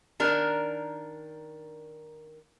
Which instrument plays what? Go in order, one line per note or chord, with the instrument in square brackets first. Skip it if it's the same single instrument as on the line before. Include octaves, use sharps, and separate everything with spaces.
[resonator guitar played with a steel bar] D#3 D4 A#4